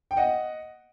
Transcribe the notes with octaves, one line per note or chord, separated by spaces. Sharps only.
G5
D#5 F#5